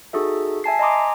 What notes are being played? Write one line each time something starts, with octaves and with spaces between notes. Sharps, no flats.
D#4 F#4 G#4 A4 E5
E5 G#5 A5 C7
D#5 G#5 A#5 C6 D6 D#6